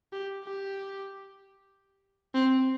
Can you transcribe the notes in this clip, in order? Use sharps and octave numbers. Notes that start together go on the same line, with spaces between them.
G4
G4
C4